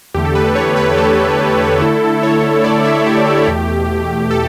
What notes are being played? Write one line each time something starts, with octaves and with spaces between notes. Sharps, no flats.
E2 D3 A3 G4
A4
B4
A4
C#5
B4
G4
A4
D3 A3 E4
C#5
D5
E5
G4
E2 B2 A3
A4